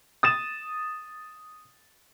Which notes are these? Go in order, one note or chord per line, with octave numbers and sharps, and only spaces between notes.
D#6 A6 E7